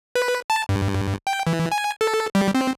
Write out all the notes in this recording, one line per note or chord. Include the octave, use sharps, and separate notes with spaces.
B4
A5
G2
G5
E3
G#5
A4
G3
C4